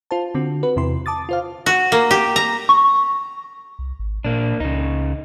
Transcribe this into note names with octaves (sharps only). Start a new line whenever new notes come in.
F4 C5 A5
D3 C4 F#4
F#4 B4
E2 C3 E4 C6
A5 D6 D#6 A6
F4 C5 F5
F#4
A#3
G4
A#5
C#6
C2
G#1
A#2 A#3 D4
C#2 C#3 D#4